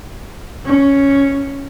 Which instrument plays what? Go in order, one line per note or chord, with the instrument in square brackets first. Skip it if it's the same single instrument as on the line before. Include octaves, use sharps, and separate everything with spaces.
[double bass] C#4